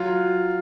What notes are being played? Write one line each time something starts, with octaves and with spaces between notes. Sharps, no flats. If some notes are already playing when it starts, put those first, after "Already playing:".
Already playing: F#3 F4